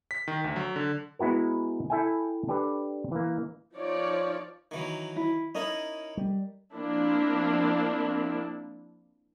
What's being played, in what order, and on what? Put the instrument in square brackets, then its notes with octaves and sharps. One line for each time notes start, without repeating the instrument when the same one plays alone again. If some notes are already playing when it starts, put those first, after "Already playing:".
[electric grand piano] B6
D#3
D2
F#3
D3
[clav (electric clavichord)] G#3 B3 E4 F#4 A#4
E4 A4 E5 G5 G#5
D4 G4 A4 B4
E3 A#3
[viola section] F3 D#4 C#5 D5
[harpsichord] D#3 E3 F#3
[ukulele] E4
[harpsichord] C#4 D#4 E4 [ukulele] A#4 D#5
[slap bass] G3
[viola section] F3 A#3 C4 D4 E4